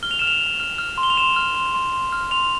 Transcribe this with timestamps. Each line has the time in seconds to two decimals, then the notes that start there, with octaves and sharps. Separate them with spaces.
0.03 F6 G7
0.11 F7
0.19 F6 E7
0.27 F7
0.40 F6
0.60 F6
0.78 F6
0.98 C6
1.03 G7
1.10 F7
1.17 C6 E7
1.36 F6
1.55 C6
1.75 C6
1.93 C6
2.12 F6
2.31 C6 F7